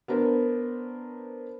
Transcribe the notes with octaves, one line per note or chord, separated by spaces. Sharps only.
B3 D4 A#4 C5